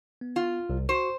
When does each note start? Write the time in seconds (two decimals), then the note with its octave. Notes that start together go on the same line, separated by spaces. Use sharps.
0.21 B3
0.36 F4
0.70 C2 C3
0.89 F#4 C5 C#6